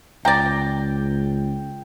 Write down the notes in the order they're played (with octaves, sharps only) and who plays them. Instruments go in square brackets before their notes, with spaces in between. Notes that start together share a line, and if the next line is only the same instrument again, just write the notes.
[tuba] C#2 [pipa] D5 A#5 [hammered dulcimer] G5